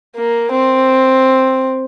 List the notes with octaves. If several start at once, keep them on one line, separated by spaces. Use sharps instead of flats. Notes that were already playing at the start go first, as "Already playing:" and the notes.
A#3
C4